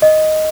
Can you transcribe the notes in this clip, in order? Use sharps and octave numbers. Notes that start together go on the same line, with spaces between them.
D#5